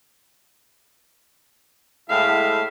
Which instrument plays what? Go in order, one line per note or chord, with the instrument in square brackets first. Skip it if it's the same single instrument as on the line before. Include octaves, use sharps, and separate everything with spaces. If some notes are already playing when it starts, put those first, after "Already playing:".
[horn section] A2 G#3 E5 [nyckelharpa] F5